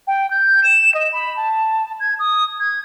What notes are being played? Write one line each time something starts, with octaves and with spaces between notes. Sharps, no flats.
G5
G6
E7
D#5
B5
A5
G#6
D#6
G#6